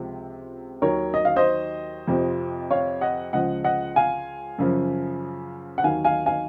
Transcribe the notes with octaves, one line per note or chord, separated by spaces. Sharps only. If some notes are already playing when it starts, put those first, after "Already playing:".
Already playing: C#2 C3 F3
D#2 D#3 F#3 A#4 C#5
D#5
F5
C5 D#5
F2 C3 F3
C#5 F5
D#5 F#5
C#2 C#3 F3 D#5 F#5
D#5 F#5
F5 G#5
F#2 C#3 F3
F#5
D#2 D#3 F#3 F5 G#5
F5 G#5
F5 G#5